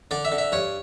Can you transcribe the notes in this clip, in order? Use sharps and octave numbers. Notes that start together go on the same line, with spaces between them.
D3 D5
E5
D3
E5
G2 C#5